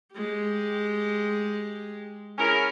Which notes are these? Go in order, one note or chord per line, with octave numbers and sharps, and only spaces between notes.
G#3 G4
C#4 E4 G#4 A#4